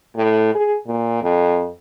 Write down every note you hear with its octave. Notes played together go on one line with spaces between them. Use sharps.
A2
G#4
A#2
F2